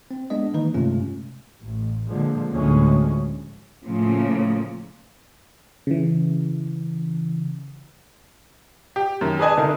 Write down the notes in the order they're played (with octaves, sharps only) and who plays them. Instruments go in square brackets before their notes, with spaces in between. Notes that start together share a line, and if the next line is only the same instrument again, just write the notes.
[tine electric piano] C4
G#3 B3 D4 D#5
D#3 E3 A#3 D#4 B4
G2 C3 G#3 A3 C#4 F4
[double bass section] A1
A#2 D3 F3 G#3
D2 A2 D3 F3 G#3 C#4
[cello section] A2 C#3 F3 A#3
[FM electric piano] C#3 E3
[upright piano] G4
F#2 D#3
G#4 B4 D5 D#5 G#5 A5
C2 D3 D#4 A#4